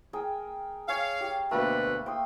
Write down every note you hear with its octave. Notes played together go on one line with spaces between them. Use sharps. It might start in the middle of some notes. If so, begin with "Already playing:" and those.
G#4 A#4 G5
C#5 F5 G#5
G4
D2 B2 A3 A#3 B4
G5 C6 D#6